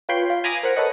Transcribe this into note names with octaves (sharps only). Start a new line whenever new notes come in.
F4 B4 C#5 G5 B5 C6
F4
G#5 A#5 B5 D6 D#6 A#6
A#4 C5 F#5
A4 B4 C#5 D#5 F#5